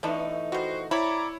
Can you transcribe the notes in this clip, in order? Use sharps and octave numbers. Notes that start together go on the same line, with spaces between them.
E3 A3 B3 D4 D#4
G3 B3 F#4 C5
C4 E4 C#5 D5 A#5 B5